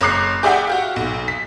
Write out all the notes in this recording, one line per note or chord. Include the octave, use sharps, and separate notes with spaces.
F#1 C#5 A#5 D6 F#6 C7
G4 G#4 D5 E5 F#5 G5
F#4 G4 F5
B1
B6